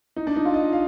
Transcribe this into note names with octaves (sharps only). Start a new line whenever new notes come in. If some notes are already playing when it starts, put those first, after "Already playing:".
D#4
D4
D#4
F4
D#5
F5